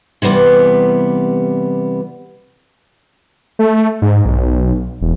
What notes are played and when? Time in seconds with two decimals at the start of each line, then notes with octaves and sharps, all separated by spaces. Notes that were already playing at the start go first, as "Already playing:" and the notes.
0.22 C3 E3 G3 B3
3.59 A3
4.02 G#2
4.25 B1
5.01 E1